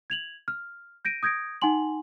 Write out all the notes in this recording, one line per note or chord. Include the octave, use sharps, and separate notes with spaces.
G#6 F7 F#7
F6
G6 A#6 D7 D#7
D#6 G6 G#6 A#6 D7
D#4 F#5 G#5 C6 F#7